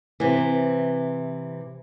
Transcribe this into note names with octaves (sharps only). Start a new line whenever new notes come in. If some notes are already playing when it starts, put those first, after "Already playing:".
C3 E3